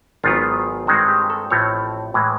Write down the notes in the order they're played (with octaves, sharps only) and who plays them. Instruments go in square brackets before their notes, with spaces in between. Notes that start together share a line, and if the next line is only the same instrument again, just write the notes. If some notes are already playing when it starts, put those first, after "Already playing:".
[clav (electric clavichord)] G#1 G#2 D#3 F#3 B3 F4
G2 D#3 G#3 C4 F#4
G4
A4
A1 A2 F3 A3 C4 C#5
A2 E3 G#3